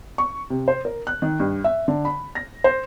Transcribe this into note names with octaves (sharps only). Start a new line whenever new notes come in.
C#6
C3
C5
A#4
F#6
D#3
G2
E5
D3
B5
A#6
C5